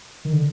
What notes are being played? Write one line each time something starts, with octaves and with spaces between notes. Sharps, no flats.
D#3
D3